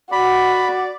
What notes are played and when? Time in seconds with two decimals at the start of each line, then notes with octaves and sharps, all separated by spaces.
0.12 F#4 D5 B5